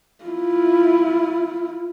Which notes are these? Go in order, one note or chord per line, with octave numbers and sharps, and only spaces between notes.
E4 F4